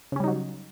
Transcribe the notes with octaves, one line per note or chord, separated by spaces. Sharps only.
C#3 F#3 G3 C#4 D#4